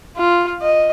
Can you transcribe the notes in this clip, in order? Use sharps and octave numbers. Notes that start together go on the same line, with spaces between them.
F4
D#5